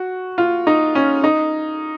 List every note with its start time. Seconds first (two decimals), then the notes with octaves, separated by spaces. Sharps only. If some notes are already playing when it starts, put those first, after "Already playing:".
Already playing: F#4
0.38 F4
0.67 D#4
0.95 C#4
1.24 D#4